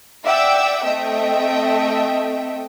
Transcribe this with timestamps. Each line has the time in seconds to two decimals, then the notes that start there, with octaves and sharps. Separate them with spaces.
0.24 D5 E5 F#5 G5 D6 E6
0.83 A3 C4 D#5 E5 G5